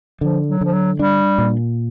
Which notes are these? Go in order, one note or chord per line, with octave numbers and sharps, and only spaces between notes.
D3 F3
F#3
D3 F3
F#3
G3 D4
A#2